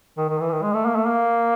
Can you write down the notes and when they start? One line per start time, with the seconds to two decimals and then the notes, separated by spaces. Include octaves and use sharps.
0.18 D#3
0.29 D#3
0.40 E3
0.52 D#3
0.63 G#3
0.74 A3
0.86 A#3
0.96 A3
1.07 A#3